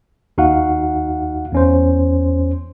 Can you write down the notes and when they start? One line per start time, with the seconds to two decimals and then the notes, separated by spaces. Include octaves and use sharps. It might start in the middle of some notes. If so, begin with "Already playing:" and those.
0.38 D#2 D#4 F#4 F5 F#5
1.52 E2 C#4 C5